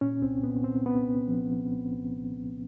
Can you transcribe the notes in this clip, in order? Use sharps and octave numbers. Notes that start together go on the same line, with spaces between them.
A#2 C#4
C2 C4
A#2 B3
A#2 C4
C2 B3
C2
F3
F3
C2
C2
C2
C2